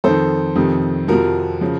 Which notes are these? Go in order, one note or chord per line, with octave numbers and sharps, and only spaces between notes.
F2 D#3 A4 C5
F2 C3 D#3
F2 C3 F3 F#4 A#4
C#3 F3